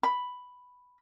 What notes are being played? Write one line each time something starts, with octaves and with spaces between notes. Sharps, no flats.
B5